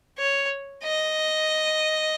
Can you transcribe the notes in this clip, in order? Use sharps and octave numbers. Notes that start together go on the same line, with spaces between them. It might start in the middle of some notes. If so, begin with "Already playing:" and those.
C#5
D#5